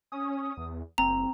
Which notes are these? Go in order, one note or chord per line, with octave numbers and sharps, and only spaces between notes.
C#4 D#6
E2
F#1 C4 A#5